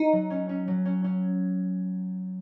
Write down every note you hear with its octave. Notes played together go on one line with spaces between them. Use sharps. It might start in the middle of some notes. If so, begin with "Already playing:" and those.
Already playing: D#4
F#3
C#4
C#4
F#3
C#4
C#4